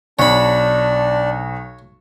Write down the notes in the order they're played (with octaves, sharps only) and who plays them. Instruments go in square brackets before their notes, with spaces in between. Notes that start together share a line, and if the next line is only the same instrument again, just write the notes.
[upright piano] B1 [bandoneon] D4 D5 [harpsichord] C#5 B5